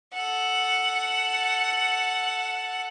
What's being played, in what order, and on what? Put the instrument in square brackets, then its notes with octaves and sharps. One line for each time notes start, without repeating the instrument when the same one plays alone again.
[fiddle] A4 F#5